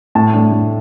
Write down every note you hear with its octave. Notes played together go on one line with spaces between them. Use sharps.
A2 A5
A3 D4
A2